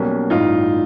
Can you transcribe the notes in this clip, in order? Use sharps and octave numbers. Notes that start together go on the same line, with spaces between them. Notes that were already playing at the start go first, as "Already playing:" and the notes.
Already playing: B1 B2 G3 A#3 C#4
A1 G2 E3 D#4 F4